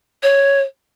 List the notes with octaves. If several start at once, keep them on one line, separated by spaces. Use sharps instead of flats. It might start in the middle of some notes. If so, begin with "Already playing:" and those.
C#5